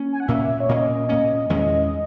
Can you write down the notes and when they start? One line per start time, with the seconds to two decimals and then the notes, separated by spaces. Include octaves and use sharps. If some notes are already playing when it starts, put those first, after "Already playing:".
Already playing: A#3 C#4
0.12 G#5
0.20 F#5
0.28 A#2 A#3 C#4 E5
0.60 C#5
0.69 A#2 A#3 C#4 D#5
1.09 A#2 A#3 C#4
1.50 E2 D#3 G#3 C#4